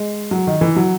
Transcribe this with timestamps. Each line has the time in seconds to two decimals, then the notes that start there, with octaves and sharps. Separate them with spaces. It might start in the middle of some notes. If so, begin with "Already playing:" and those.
Already playing: G#3
0.31 F#3
0.47 D#3
0.61 E3
0.76 F#3